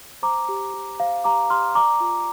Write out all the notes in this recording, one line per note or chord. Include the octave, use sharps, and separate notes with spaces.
C5 A#5 D6
G4
G4
C5 F5
G4 A#5 D6
G4 C6 F6
D5 A#5 D6
F4